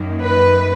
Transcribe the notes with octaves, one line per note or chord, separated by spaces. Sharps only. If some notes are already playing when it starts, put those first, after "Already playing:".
Already playing: F#2 D#3 A#3
B4